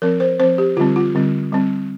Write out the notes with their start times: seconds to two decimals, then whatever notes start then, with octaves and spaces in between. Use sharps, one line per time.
0.02 F3 C4 A#4
0.20 C5
0.40 F3 C4 C5
0.58 G4
0.77 D3 G3 C4 F4
0.96 F4
1.15 D3 G3 C4
1.53 G3 C4